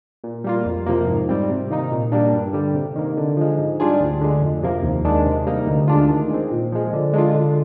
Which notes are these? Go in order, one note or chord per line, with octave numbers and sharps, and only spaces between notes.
A#2
G3 A#3 F4
F2
C3 F3 A#3
G#2
G3 C4
C3
D#3 A#3 D#4
A#2
G3 A#3 D4
G2
D3 G3
C3
D#3 A#3
D3
F3 G#3
G#2
G3 D4 F4 G#4
D2
D3 G#3
F2
C3 F3 A#3
D#2
D#3 G#3 D4
C3
G3 A#3 D#4
D2
D3 G#3 D4 F4
D#3
G#3 C4
A#2
F3 G#3
D3
G#3 D4 F4
D3